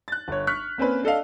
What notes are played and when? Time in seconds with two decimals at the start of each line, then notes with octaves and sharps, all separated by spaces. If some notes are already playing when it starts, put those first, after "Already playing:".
0.08 F#6 A6
0.28 G1 C#5
0.47 C#6 F6 F#6 B6
0.78 A#3 C4 C#4 B4
1.03 D4 A4 D#5 F5